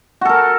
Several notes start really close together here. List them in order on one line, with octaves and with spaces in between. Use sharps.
F#4 A4 A#4